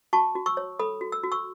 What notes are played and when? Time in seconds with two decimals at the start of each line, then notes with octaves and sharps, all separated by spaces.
0.13 F#4 A5 C#6
0.35 F#4
0.46 C#6 E6
0.57 C#5
0.79 A4 B5 D#6
1.01 F#4
1.12 E6
1.24 F#4
1.32 C#6 E6